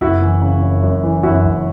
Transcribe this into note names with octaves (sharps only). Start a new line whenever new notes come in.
F#1 E4 F#4
E3
C#3
F#2
F#2
E3
F#2 E4 F#4
F#1